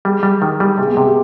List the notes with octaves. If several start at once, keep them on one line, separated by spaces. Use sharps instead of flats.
G3 G#3
G3
D#3
G3
C3 G#3
B3
C3 G#3
G4